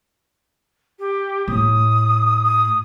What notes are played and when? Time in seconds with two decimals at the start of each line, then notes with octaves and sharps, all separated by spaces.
0.99 G4
1.48 A2 D#6
2.44 D#6